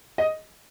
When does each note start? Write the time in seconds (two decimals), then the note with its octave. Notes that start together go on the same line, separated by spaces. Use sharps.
0.18 D#5